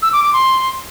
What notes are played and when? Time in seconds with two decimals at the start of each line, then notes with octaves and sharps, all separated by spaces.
0.02 E6
0.13 D6
0.23 D6
0.33 C6